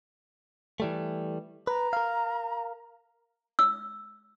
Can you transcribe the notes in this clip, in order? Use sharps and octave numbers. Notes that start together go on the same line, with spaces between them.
E3 G3 A3
B4 A#5
A#4 F5
E6